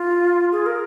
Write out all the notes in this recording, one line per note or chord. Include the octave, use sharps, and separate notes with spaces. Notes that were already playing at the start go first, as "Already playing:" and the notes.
Already playing: F4
G#4
A#4